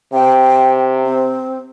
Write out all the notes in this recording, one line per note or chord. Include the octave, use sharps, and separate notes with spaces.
C3 G5
C4